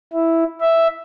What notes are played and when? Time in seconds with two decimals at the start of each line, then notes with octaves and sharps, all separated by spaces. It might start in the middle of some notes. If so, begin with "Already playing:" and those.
0.13 E4
0.61 E5